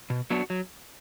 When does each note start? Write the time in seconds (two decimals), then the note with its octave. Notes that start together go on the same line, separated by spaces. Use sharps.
0.10 B2
0.30 F#3 B3 D4 F#4
0.50 F#3